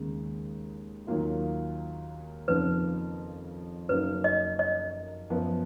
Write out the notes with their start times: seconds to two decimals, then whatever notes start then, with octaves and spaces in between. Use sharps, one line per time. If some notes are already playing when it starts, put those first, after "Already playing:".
Already playing: D#2 C#3 G#3
1.07 D#2 D#3 F#3 A#3 F4
2.48 F2 C#3 F3 A#3 D#4 B4
3.89 F#2 C#3 F#3 A#3 D#4 B4
4.24 D#5
4.59 D#5
5.30 F#2 F3 B3